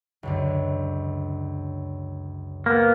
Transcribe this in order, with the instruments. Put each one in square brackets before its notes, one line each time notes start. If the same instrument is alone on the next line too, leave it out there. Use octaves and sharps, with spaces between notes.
[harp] C#2 F#2 D3
[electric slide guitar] A#3 B3